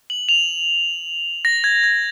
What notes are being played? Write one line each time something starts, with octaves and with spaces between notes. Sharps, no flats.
F#7
F7
A#6
G#6
G#6